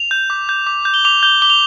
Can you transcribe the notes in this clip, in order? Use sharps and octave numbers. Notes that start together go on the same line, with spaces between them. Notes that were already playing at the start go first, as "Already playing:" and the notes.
Already playing: F7
G6
D6
G6
D6
G6
G7
D6 F7
G6 G7
D6 G7
F7